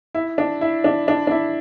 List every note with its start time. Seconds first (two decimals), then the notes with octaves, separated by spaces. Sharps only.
0.15 E4
0.38 D4
0.61 E4
0.84 D4
1.08 D4
1.27 D4
1.31 E4